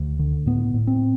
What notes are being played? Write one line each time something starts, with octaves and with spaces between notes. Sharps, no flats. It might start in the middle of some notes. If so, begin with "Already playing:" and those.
Already playing: D2
D3
A2 B3
A2
C4